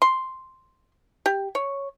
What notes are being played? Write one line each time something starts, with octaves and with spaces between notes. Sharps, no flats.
C6
G4
C#5